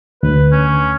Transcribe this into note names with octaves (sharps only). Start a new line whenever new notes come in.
D2 B4
C#4